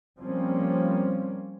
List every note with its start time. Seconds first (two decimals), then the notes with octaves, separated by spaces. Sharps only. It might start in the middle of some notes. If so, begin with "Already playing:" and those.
0.18 F3 G3 A#3 C4 C#4